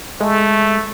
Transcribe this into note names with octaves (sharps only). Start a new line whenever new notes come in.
G#3 A3